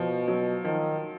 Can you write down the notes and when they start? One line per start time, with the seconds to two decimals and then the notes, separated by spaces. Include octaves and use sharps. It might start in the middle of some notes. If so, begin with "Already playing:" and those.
Already playing: B2 F3
0.28 F#3
0.65 D#3 F3